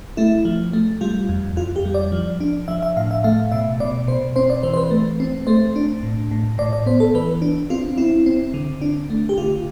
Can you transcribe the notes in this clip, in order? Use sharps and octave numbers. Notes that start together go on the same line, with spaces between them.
A3 E4
F3
A3
G3 F4
F2
F2 F4
G4
G3
D5
F3
D4
F3 E5
E5
A2 F5
E5
A3 F5
B2 E5
B2 D5
B2 C5
C4 C5
D5
E3 C5
C5
B4
A3
C4
A3 C5
D4
A2
A2
A2 D5
D5
B3 C5
A4
E3 B4
D4
C4 F4
C4 E4
C4
D3
D4
A3
G4
D3 F4